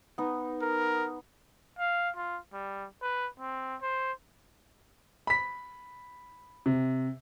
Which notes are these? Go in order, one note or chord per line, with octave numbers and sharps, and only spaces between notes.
B3 D#4
A#4
F5
F4
G3
B4
C4
C5
B5 B6
C3